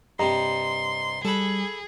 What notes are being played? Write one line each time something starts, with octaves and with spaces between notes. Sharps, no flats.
G2 C3 D#5 A#5 C6
G3 G#4 A4 B4